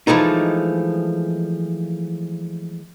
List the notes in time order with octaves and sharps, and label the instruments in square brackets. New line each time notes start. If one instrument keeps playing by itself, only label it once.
[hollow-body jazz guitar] E3 F3 G#3 A3 D#4